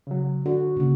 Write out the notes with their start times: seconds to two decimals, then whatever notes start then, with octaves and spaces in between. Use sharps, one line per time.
0.07 C#3 F#3
0.46 D3 F#4
0.77 A#2 C#3